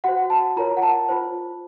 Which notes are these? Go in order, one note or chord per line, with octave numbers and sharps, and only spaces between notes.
F#4 C5 F#5
A5
F4 A#4 C#5 A#5
F#5
A5
F4 C5